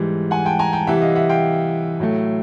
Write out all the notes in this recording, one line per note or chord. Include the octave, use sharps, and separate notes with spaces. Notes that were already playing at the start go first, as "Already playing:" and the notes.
Already playing: G#2 E3 G3
F#5 G#5
G5 A5
G#5 A#5
G5 A5
C3 E3 G3 E5 F#5
D#5 F5
E5 F#5
F5 G5
A2 F#3 A3